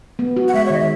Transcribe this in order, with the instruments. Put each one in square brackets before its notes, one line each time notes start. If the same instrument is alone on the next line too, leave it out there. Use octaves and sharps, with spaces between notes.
[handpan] B3
F#4
[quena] F#5
[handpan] G#3 [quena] E5
[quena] C#5
[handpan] D#3 [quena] D#5
[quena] E5